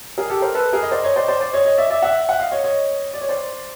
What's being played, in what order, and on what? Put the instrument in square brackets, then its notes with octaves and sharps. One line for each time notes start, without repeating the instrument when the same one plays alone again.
[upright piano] G#4 A#4
G4 A4
A#4 C5
A4 B4
G#4 A#4
D#5
C5 D5
C#5 D#5
C5 D5
C5 D5
C5 D5
C#5 D#5
C#5 D#5
D5 E5
D5 E5
E5 F#5
F#5
D#5 F5
C#5 D#5
C#5 D#5
D5
C#5
C5 D5